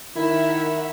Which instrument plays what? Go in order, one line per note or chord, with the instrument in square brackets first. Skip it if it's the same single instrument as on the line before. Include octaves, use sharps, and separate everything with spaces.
[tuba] D#3 [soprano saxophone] E4 [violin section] A#4 E5 F#5